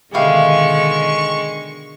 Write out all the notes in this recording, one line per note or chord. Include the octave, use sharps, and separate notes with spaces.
B2 D3 D#3 G#3 E4 G4 F5 C#6